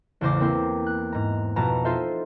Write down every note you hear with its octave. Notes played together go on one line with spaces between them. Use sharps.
A1 E2 C#3 C5 D6 A#6
A#3 C4 E4 C5
F#6
G#2 A#5
F2 B2 B3 A5 A#5 A#6
D#4 F4 A4 C5 E5